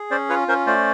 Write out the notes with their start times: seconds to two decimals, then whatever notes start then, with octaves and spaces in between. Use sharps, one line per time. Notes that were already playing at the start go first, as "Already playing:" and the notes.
Already playing: G#4
0.11 C#4 C5 D5
0.29 F4 B4 C#5
0.48 C#4 A#4 C5
0.67 A3 C5 D5